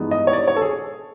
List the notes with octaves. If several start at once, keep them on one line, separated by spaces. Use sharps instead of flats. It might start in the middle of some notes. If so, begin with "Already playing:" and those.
Already playing: G2 E3 G#3 B3 D#4
D#5
C#5
D5
C#5
A4
G#4